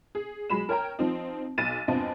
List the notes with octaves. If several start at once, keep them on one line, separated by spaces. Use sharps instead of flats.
G#4
F#3 G#3 B5 E7
A#4 C#5 G5 A#5
F3 C4 D#4
B1 A6 D#7 E7
E2 G2 C4 F4 D#5 A5